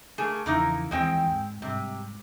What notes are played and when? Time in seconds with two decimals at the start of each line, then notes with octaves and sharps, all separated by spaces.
0.18 A3 A#3 G#4
0.46 E2 C#3 F3 A#3 D#4 E4
0.91 D#2 E3 F3 G#3 C4 G5
1.26 G#2
1.62 G#2 C3 G3